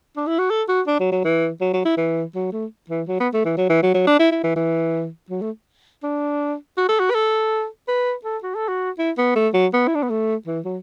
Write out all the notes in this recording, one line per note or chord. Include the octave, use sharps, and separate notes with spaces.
D4
E4
F#4
A4
F#4
D4
F#3
F#3
E3
F#3
F#3
E4
E3
F#3
A3
E3
F#3
B3
A3
E3
F#3
E3
F#3
F#3
D4
E4
E4
E3
E3
F#3
A3
D4
F#4
A4
F#4
B4
A4
B4
A4
F#4
A4
F#4
E4
B3
A3
F#3
B3
E4
D4
B3
A3
E3
F#3